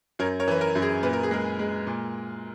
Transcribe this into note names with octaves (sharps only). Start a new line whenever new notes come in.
F#2 A#4 C#5
A#4 C#5
E3 B4
A#4
F#2
G#4
A#2 B4
A#4
G#4
G#3 A#4
G#3
A#2